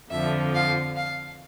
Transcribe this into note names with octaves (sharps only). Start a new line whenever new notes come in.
F2 D3 F3 E5
F5
F5